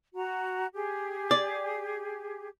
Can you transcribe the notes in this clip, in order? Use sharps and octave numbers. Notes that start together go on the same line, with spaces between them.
F#4 A#5
G4 G#4
D5